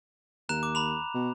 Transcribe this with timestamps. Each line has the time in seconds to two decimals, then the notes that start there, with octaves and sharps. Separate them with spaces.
0.49 D#2 A#5 F#6 E7
0.63 D6
0.75 A#5 B5 F7
1.14 B2